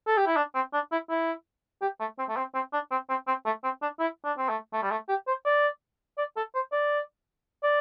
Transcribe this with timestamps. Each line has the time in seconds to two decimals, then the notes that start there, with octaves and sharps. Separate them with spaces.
0.07 A4
0.17 G4
0.27 E4
0.37 D4
0.55 C4
0.74 D4
0.92 E4
1.10 E4
1.82 G4
2.00 A3
2.19 C4
2.29 A3
2.37 C4
2.55 C4
2.73 D4
2.91 C4
3.10 C4
3.28 C4
3.46 A3
3.64 C4
3.82 D4
4.00 E4
4.25 D4
4.38 C4
4.49 A3
4.73 A3
4.82 G3
4.91 A3
5.09 G4
5.27 C5
5.45 D5
6.18 D5
6.36 A4
6.55 C5
6.72 D5
7.63 D5